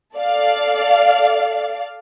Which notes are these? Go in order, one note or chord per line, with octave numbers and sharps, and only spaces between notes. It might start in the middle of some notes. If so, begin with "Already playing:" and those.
A4 D5 F5